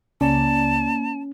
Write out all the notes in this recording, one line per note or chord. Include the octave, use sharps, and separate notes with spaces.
C#2 C#3 A#3 C#4 D5 A5